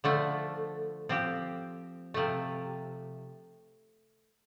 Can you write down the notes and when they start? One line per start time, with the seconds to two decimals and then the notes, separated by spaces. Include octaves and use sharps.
0.04 D3 F3 A3
1.09 F3 C4 G4
2.14 C3 F3 A3